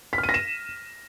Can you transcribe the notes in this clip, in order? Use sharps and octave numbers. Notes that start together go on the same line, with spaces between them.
B6
F6
D#7
A#6
E7